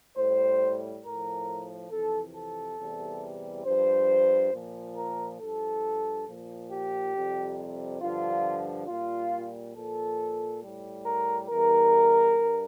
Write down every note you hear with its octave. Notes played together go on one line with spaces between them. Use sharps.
A2 G3 C5
A2 F3 A#4
F2 C3 E3 A4
A4
E2 C3 E3 G3
G2 F3 C5
A#2 F3
A#4
G2 F3 A4
A#2 F3
G4
F2 C3 G3
G2 D3 F3 F4
A#2 G3 F4
A#2 F3 A4
A2 G3
A#4
E2 E3 G3 A#4
G2